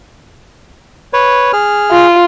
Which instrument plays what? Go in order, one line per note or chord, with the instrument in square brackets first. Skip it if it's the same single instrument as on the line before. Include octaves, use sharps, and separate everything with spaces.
[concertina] B4 C#5
G#4 F6
[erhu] F4